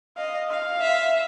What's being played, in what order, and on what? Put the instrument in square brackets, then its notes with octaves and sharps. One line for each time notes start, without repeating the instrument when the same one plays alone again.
[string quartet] D#5 [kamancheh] F5
[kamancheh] F5
[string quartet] E5